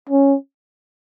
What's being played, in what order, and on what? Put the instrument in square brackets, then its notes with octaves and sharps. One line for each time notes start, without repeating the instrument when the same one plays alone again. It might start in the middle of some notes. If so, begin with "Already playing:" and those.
[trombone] C#4